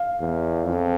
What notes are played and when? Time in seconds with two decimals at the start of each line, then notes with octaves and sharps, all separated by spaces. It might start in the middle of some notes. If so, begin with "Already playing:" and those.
Already playing: F5
0.20 E2
0.64 F2